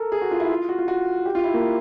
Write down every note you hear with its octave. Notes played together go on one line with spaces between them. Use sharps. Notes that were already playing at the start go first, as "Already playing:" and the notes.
Already playing: A4 A#4
G#4
F#4
F4
E4
F4
F#4
F4
F#4
G4
F4
E4
A#3